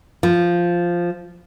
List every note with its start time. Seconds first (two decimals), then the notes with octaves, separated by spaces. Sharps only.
0.23 F3